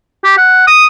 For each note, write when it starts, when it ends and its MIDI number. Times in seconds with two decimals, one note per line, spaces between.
0.24 0.33 67
0.38 0.65 78
0.67 0.86 87